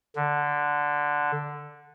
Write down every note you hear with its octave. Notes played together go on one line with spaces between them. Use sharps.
D3